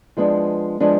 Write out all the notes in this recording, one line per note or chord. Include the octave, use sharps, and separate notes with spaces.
F3 G#3 B3 D4
F3 G#3 B3 D4